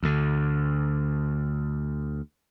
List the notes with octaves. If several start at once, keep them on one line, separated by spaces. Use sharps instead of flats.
D2 D3